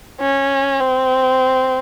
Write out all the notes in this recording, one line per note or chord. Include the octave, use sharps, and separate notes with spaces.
C#4
C4